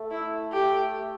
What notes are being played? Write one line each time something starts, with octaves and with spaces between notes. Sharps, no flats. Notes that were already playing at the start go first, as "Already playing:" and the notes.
Already playing: A3
E4
G4